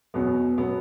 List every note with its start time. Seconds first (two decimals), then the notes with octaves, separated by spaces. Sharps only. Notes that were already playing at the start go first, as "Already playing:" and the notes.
0.14 E2 B2 F#3 B3
0.57 B2 F#3 B3